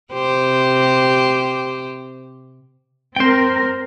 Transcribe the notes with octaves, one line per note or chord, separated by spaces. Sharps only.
C3 G4 C5
C4 A#4 C5 G5